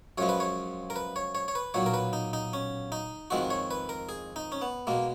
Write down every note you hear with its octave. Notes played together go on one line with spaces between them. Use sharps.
F#2 F3 G#3 C#5
B4
C#5
A#4
B4
C#5
C#5
C#5
B4
B1 A#2 F#3 C#5
A#4
B4
D#4
D#4
C#4
D#4
F2 D#3 G#3 F#4
C#5
B4
A#4
G#4
D#4
C#4
B3
B2 G#3 A#3